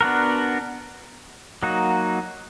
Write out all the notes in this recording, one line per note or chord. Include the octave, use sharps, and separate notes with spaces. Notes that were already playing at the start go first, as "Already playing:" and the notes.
B3 D4 F#4 A#4
F#3 A#3 D#4 F#4